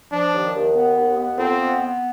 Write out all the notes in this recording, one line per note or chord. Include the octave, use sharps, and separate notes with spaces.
F3 D4
D#2
D#2
B3
D#2
B3
F2 C4
B3
B3